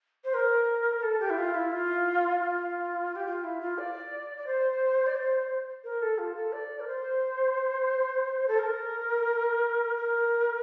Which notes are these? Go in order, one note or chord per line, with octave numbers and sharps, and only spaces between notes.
C5
A#4
A4
G4
E4
F4
E4
F4
F4
G4
F4
E4
F4
D5
D5
C5
D5
C5
A#4
A4
F4
A4
D5
A#4
C5
A4
A#4
A#4